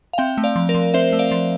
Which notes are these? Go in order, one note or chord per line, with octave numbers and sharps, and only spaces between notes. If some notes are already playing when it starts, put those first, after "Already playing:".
F5
C4 E5 G5
A3
D5 F5
F3
A#4 D5
F3
C4 C5 E5
A3
D5 F5
F3